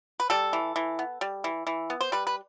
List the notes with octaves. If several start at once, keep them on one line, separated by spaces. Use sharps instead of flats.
B4
G3 A4
E3
E3
B3
G3
E3
E3
B3
C5
G3 B4
B4